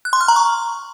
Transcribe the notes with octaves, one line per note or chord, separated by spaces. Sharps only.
F#6
C6
F6
A#5
C#6